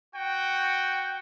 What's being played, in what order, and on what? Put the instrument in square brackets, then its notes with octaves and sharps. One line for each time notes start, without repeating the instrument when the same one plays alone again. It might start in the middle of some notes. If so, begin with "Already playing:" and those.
[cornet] F#4 [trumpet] G5